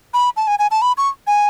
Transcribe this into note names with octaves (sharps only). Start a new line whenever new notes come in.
B5
A5
G#5
G#5
A5
B5
C#6
G#5